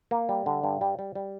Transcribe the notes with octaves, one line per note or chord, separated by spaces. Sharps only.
A#3
G3
D3
G2
G3
G3
G3